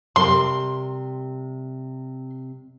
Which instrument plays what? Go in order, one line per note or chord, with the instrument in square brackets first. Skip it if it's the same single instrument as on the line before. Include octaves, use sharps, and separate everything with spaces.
[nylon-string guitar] C3 G3 A#4 [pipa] C6